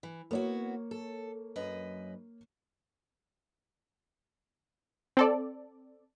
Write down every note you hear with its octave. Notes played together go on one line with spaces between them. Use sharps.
E3
A#3 B3 E4 F#4 C#5
A4
F#2 B4 D#5
C4 A4 D5